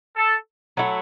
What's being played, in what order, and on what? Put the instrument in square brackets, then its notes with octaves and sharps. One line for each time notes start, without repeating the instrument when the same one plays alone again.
[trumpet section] A4
[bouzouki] F#3 A3 E4